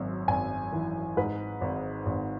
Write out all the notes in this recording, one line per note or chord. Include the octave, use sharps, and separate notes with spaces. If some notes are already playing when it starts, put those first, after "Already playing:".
Already playing: G#1 F#2
G#1 G#5
E3
G#2 B4
G#1
G#1